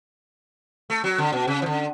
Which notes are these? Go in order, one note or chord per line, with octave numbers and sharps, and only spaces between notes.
A3
F#3
D3
B2
C#3
E3
D3